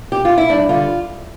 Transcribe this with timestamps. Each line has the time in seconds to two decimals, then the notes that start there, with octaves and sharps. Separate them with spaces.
0.12 G4
0.25 F4
0.38 E4
0.50 G2 D4
0.69 D3 F4